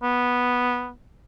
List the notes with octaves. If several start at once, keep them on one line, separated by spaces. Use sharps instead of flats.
B3